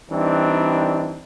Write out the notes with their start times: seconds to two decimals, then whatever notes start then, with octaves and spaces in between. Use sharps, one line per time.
0.10 E3 G3 C4 D4 D#4